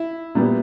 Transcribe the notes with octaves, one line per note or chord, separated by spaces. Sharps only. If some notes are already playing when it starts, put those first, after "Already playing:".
Already playing: E4
A#2 G3 B3